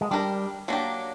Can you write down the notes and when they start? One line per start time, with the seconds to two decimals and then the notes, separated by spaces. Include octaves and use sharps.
0.01 G#3
0.11 G3 D4 G4 A#4
0.68 F#3 A#3 D4 G4